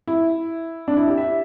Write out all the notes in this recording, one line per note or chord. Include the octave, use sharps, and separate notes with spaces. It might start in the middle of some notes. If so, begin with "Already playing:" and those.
E4
D4
E4
G4
E5